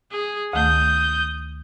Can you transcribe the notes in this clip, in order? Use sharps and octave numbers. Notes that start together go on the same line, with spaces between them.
G#4
D2 D#3 A3 D#6 G6